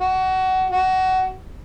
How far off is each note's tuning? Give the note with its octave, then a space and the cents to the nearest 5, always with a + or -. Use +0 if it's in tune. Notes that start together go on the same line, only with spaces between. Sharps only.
F#4 +20
F#4 +20